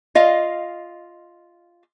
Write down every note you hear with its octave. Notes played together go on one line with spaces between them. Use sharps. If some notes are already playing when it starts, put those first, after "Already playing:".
F4 D#5 F5